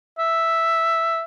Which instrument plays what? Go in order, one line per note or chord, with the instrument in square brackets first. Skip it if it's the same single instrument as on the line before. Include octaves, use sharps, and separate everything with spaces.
[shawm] E5